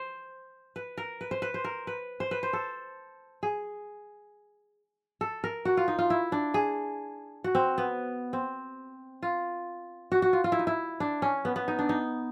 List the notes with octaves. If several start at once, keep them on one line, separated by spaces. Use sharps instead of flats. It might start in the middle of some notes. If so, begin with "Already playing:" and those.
Already playing: C5
B4
A#4
B4
C5
B4
C5
A#4
B4
C5
B4
C5
A4
G#4
A4
A#4
F#4
F4
D#4
F4
E4
D4
G#4
F#4
C4
B3
C4
F4
F#4
F#4
F4
F4
E4
D#4
E4
D4
C#4
B3
B3
D#4
D4
D#4